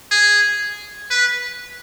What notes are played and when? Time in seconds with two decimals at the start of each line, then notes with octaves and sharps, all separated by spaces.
0.11 G#4
1.10 B4